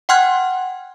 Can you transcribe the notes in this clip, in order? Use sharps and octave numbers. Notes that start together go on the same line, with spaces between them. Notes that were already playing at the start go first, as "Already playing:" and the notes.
F#5 G5 C6 F6 F#6 G#6